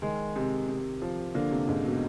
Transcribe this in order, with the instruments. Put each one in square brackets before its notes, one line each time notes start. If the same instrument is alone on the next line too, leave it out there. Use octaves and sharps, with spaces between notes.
[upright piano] D#3 [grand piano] G#3
[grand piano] C3
C3
F3
[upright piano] D3 [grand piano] A#3
[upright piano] C3
[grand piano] G#2 [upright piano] C#3
[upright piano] B2